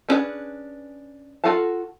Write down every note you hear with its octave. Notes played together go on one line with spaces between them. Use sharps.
B3 C#4 D4 G#4 B4
F4 F#4 A4 F5 A5